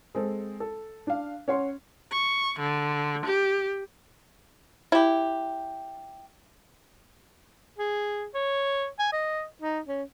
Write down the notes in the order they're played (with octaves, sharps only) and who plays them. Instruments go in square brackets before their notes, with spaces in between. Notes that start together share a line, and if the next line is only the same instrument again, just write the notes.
[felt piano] G#3 C4 A4
A4
D4 F5
C#4 C#5 F#5 C6
[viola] C#6
D3
G4
[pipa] E4 G4
[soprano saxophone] G#4
C#5
G#5
D#5
D#4
C#4